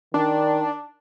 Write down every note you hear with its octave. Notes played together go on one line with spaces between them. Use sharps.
D#3 D4